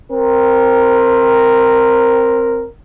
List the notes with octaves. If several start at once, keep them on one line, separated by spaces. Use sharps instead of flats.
C4 A#4